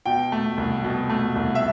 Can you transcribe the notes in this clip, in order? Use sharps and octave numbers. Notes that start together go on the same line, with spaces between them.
B2 G5
A3
C2
B2
A3
C2
E5